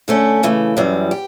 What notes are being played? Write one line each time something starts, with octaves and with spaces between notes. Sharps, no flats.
D3 A3 C#4
C#3 E3 A3
F#2 E3 G3
G4